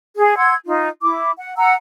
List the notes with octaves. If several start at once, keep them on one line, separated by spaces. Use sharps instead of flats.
G#4
F#5 C6 E6 G#6
D#4 F4
E4 D6
F#5
F#5 A#5 E6